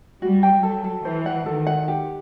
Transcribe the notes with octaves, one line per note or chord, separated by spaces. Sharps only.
G3 F#4
G5
F#3 A4
A4
E3 C5
F#5
D#3 A4
F#5
G4